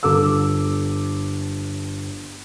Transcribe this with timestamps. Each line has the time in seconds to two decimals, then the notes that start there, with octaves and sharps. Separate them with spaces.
0.03 G1 A4 D6 E6